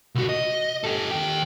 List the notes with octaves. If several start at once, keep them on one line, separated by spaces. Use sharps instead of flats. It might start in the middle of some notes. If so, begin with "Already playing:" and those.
C2 F#4
D#5
G4 A4
D#2 G5